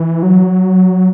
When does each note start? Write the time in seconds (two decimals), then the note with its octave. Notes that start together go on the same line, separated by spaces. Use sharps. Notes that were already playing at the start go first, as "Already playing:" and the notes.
Already playing: E3
0.23 F#3